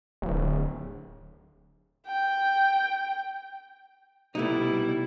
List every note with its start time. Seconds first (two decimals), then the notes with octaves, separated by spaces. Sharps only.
0.22 D1
2.07 G5
4.35 C2 B2 G3 A3 B3 D#4 E4